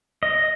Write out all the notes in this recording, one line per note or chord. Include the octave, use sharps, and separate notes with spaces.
D#5